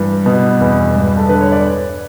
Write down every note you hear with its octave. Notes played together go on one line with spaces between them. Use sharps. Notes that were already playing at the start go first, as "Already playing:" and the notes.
Already playing: G2 E3
B2
E2
G2
A4
D3 B4
C#5
D5